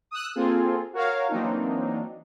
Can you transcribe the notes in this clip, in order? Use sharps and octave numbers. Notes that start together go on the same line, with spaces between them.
D#6 E6 F#6
A#3 C4 F4 G#4 A4
F#4 A#4 C#5 F5
E3 F#3 A#3 C4 D4 D#4